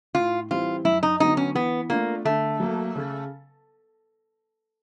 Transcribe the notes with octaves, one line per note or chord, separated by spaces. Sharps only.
A2 F4
E3 G3 C4 E4 F4
F#2 E4
D#4
D3 F#3 B3 D#4
C#4
E3 B3
A3 A#3 D4 F4
D3 A3
F#3 A#3
C#3